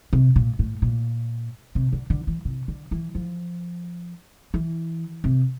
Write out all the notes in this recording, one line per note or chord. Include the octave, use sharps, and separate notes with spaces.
C3
A#2
A2
A#2
C3
D3
D3
E3
C3
D3
E3
F3
E3
C3